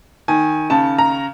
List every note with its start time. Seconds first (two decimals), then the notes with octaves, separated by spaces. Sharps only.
0.28 D#3 G#5
0.70 C#3 A5
0.98 A#5